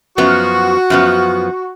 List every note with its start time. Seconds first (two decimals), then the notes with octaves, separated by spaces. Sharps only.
0.18 F#2 F3 B3 F#4
0.90 F#2 F3 B3